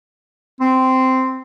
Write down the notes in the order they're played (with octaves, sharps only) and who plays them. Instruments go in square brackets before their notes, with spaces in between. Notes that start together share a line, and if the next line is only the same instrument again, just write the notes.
[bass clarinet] C4